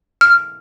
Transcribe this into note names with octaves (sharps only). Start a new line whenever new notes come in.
F6